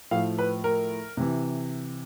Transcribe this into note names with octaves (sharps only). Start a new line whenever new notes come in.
A2 F3 F5
B4
A#4
C3 E3